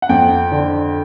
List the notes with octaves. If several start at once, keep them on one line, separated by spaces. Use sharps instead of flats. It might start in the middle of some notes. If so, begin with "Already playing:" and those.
F#5
F2 G5
D3